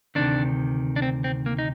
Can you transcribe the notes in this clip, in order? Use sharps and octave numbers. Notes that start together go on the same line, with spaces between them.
D2 C3 D#3 D4
D4
C4
C4
A#3
D#4